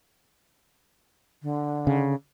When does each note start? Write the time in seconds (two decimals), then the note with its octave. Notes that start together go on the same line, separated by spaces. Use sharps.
1.42 D3
1.87 C#3